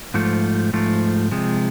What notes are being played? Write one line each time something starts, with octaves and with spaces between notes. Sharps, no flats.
G#2 F3 A3
G#2 F3 A3
C3 F3 G#3